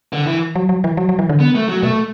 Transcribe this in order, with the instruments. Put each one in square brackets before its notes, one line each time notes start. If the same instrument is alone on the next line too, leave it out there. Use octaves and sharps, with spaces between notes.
[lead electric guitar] D3
E3
[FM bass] F#3
F#3
E3
F#3
F#3
E3
D3
[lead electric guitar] B3
A3
F#3
[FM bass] B2 [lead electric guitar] A3